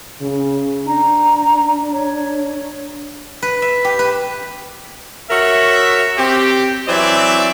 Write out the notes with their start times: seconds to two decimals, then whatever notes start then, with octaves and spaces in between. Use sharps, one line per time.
0.21 C#3
0.87 D4 A#5
1.92 C#5
3.42 B4
3.62 E5
3.84 G4
3.99 B4
5.30 F#4 A#4 C#5 E5
6.18 C4 G4
6.88 E3 F#3 C4 D5 E5